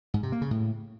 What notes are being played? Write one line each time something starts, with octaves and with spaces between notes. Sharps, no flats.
G#2
C3
A#3
C#3
A2